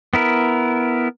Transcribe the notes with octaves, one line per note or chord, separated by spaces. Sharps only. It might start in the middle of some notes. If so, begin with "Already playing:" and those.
B3 E4 A#4